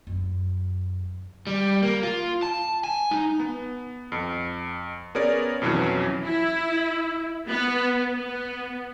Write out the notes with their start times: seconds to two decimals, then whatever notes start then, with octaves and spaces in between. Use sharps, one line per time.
0.07 F#2
1.47 G3
1.83 A#3
2.03 F4
2.43 A5
2.84 G#5
3.11 D#4
3.40 B3
4.12 F2
5.15 B3 C#4 G#4 A#4 C#5 D5
5.62 F2 B2 E3 F#3 C#4
6.23 E4
7.47 B3
8.14 B3